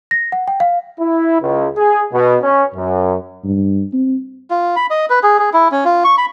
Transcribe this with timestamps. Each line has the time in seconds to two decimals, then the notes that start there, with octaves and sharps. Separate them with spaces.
0.11 A#6
0.32 F#5
0.48 G5
0.60 F5
1.00 E4
1.41 C#2
1.76 G#4
2.13 B2
2.42 C#4
2.74 F#2
3.44 G2
3.93 C4
4.51 F4
4.76 B5
4.90 D#5
5.10 B4
5.23 G#4
5.39 G#4
5.53 E4
5.71 C#4
5.85 F4
6.04 C#6
6.18 B5